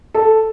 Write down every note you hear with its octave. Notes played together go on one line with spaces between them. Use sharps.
A4